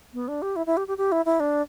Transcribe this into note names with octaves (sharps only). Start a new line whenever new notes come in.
B3
D4
G4
E4
E4
G4
G4
G4
E4
E4
D4